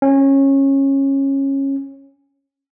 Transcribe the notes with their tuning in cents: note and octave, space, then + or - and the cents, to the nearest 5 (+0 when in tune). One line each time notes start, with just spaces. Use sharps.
C#4 -20